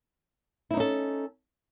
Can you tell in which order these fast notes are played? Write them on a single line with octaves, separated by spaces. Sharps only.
E4 D#4 C#4 A4